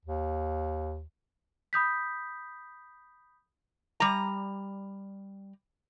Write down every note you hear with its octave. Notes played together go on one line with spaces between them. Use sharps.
D#2
B5 D#6 G6 B6
G3 A#5